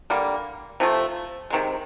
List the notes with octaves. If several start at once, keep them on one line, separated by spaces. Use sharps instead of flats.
D3 G3 A#3
C3 F3 A3
C3 D#3 G#3